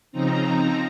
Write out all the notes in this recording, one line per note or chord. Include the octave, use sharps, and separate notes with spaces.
C#3 F3 C4 D#4 A#5
F3 C4 D#4